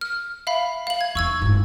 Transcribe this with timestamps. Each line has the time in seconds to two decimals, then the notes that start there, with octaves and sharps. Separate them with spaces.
0.01 F6
0.47 E5 F5 B5
0.87 F5 F#7
1.01 G#6
1.15 E2 D#4 C#6 E6 G#6
1.42 G1 A2